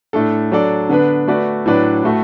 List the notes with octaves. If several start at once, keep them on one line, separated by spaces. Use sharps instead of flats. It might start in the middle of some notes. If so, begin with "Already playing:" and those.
A2 A3 D4 A4
F#3 D4 A4 D5
D3 B3 D4 B4
A3 F#4 B4 D5
A2 F#3 D4 B4 D5
A2 A3 F#4 A4